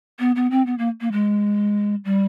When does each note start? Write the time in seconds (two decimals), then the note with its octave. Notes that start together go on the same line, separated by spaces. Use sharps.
0.19 B3
0.36 B3
0.51 C4
0.66 B3
0.78 A#3
1.01 A#3
1.12 G#3
2.05 G3